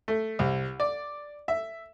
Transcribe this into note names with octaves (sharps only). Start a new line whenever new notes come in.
A3
C2
D5
E5